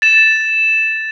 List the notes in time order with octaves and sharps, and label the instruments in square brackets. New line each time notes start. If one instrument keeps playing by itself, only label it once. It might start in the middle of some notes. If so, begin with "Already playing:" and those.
[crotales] A6 E7